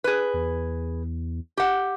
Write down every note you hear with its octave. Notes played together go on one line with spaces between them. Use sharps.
G#4 B4
E2
G4 F#5